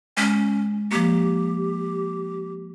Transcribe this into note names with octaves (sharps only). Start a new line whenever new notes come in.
G#3 C#4
F3 A#3 G4